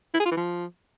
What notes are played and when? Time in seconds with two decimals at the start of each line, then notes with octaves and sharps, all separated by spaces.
0.14 E4
0.20 G#4
0.26 F4
0.31 E3
0.37 F3